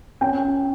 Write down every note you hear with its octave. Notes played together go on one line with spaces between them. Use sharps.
C#4 G5